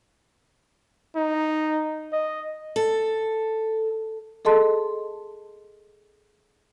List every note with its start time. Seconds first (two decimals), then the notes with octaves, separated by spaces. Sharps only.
1.15 D#4
2.13 D#5
2.76 A4
4.45 G#4 A4 D#5 A5 C6